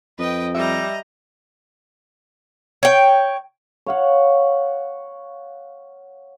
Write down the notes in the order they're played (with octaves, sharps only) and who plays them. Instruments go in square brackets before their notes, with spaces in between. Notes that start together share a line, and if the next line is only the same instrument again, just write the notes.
[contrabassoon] F2 [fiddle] B4 G5 [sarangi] D#5
[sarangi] G3 [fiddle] D#5 A#5 [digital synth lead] E5
[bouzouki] C#5 G5
[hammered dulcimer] C#5 F5 F#5